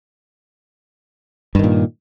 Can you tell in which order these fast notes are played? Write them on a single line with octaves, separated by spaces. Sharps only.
G2 D#3 A#2